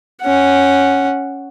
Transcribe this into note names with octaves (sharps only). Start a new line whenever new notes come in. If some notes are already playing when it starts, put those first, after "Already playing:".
C#4 F#5